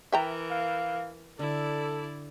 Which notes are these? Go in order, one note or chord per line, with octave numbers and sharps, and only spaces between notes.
E3 A#4 E5 G5 A#5
F5
D3 E4 A4 D5